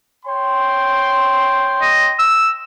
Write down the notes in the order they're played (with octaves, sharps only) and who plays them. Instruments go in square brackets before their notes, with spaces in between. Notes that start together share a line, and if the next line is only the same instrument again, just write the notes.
[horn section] C#5 G5 C6
[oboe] D#5
E6